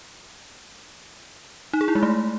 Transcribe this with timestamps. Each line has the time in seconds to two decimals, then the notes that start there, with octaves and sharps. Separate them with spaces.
1.73 D#4
1.81 G#4
1.88 E4
1.95 G#3
2.03 A3